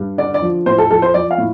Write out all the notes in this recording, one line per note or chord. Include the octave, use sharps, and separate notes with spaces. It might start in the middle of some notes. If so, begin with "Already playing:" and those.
Already playing: G2
D3 D5
D5
F3
A2 C5
A4
F3 A4
C5
F3 D5
F5
A2